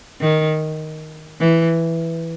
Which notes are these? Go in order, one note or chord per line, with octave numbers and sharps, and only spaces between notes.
D#3
E3